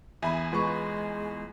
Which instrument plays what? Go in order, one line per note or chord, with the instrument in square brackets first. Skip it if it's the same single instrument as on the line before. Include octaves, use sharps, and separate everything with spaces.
[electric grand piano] E2 G#5 [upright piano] E5 B5
[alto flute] G#3 [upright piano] F4 B4 C#6